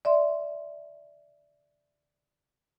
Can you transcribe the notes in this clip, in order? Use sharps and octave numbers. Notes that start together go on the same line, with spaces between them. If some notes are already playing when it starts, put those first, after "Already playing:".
D5 E5 C6